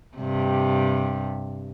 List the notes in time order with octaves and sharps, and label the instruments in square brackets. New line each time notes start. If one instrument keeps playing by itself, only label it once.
[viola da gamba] G2 C3